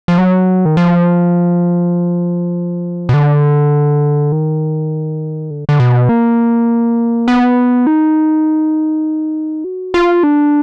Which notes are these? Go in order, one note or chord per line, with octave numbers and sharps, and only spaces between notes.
F3
F#3
D#3
F3
B2
D3
D#3
D3
D3
B2
A#3
B3
D#4
F#4
F4
D4